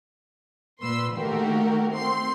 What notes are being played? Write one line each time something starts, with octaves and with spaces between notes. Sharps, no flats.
A#2 B4 C6 E6
D#3 A3 A#3 F#4 G4 A#4
C4 C6